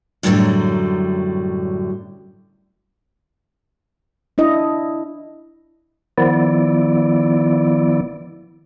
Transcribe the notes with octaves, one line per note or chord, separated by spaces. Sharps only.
F#2 A2 D3 F#3 G3
D4 E4 D#5
D#3 F3 B3 E4 D5